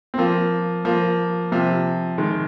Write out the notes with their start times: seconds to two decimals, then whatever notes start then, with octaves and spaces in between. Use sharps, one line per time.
0.14 C4
0.18 F3 A#3
0.85 F3 A#3
1.52 C3 F3
2.18 D#3 G#3